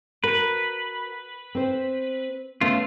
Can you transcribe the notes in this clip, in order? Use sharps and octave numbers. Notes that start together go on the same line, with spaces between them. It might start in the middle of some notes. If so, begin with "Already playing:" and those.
F#4 A#4 B4
C4 C5
A3 B3 C#4 F4